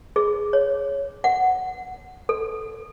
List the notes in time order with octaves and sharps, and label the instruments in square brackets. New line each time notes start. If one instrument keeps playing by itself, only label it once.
[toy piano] G#4
C#5
F#5
A4